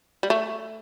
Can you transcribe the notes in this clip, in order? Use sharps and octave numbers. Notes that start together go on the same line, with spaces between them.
G3
A3